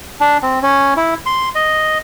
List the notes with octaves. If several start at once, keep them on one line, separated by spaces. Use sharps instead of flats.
D4
C4
C#4
E4
C6
D#5